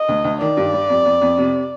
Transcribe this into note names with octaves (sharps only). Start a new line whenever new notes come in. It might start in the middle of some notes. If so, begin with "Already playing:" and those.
Already playing: D#5
D2
D2
D#3 D5
G2
G3
F2
F2
F2
C3